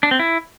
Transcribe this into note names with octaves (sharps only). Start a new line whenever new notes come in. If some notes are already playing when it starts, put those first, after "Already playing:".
D4
C4
E4